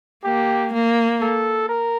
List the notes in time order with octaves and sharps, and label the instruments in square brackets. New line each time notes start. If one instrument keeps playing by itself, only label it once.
[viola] A#3 [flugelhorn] G4
[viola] A#3
[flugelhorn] A4
A#4